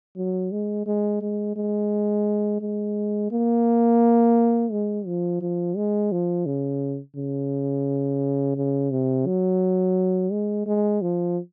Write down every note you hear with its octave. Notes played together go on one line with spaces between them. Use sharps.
F#3
G#3
G#3
G#3
G#3
G#3
A#3
G#3
F3
F3
G#3
F3
C#3
C#3
C#3
C3
F#3
G#3
G#3
F3